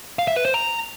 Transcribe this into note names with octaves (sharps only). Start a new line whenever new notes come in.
F5
E5
B4
C5
A#5